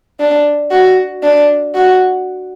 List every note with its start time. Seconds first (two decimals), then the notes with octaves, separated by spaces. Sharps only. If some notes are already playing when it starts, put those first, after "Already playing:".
0.20 D4
0.71 F#4
1.23 D4
1.75 F#4